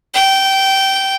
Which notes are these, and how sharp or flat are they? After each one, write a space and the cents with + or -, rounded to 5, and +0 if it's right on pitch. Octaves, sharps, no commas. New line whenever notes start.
G5 -15